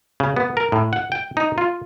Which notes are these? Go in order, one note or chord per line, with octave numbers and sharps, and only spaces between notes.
C#3
B3
A#4
A2
F#5
G5
D#4
F4